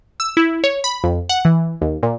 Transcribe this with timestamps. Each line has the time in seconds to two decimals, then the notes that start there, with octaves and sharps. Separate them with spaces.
0.20 E6
0.37 E4
0.64 C#5
0.84 B5
1.04 F2
1.29 F#5
1.45 E3
1.81 D#2
2.03 A#2